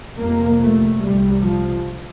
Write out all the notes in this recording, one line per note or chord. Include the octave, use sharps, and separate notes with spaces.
F2 C3 A#3
A3
C2 C3 G3
F3